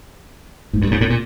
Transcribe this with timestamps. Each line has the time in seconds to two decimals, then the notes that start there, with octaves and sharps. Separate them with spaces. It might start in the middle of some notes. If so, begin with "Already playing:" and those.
0.73 G#2
0.82 G2
0.91 G#2
1.01 A2
1.10 A#2